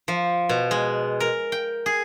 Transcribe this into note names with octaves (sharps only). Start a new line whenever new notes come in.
F3
B2
G#3
A#4
G5
G#4